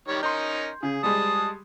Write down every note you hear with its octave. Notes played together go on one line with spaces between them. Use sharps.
D#3 G3 C#5
C#4 D#4 A#4 C6 G6
C#3 G#4
G3 G#3 A5 D#6